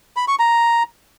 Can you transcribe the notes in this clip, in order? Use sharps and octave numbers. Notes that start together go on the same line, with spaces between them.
B5
C#6
A#5